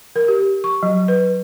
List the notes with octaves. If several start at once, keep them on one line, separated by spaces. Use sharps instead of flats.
A#4
G4
C#6
F#3
B4